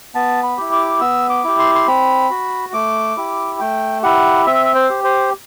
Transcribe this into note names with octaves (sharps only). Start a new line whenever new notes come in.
B3 A5
B5
E4 G4
D6
B3 E6
D6
E4 G4
C6
C6
C4 B5
F#4
A3 D6
E4 G4
A3 G5
E4 G4 F#5
C4 E5
C5
G4
C5